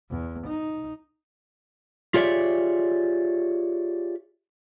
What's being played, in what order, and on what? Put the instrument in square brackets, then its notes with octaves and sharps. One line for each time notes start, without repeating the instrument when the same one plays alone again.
[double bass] E2
D#4
[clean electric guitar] F4 G4 G#4 C#5 D5 E5